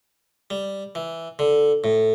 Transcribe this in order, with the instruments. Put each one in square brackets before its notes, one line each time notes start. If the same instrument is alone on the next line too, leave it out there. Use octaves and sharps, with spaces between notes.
[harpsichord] G3
E3
D3
A2